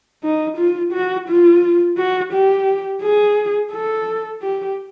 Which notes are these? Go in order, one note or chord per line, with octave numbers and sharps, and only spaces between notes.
D#4
F4
F#4
F4
F#4
G4
G#4
A4
G4